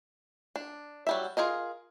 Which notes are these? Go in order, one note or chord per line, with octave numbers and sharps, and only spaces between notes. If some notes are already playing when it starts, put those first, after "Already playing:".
D4
F#3 G3 E5
F4 G#4 A#4 D#5